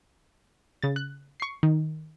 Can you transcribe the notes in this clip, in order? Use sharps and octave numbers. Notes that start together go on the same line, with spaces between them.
C#3 A6
F#6
C#6 C7
D#3